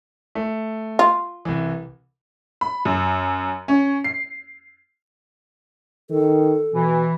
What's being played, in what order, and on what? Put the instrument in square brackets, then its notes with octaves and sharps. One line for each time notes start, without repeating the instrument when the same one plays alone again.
[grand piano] A3
[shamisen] F4
[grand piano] C2 E3
[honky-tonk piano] B5
F#2
C#4
C7
[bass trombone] D#3 [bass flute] A4
[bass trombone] B2 [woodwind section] E3